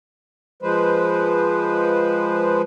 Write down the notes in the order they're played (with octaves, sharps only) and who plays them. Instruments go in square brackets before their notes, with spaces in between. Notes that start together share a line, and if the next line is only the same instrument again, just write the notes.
[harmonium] F3 G#3 B4 C5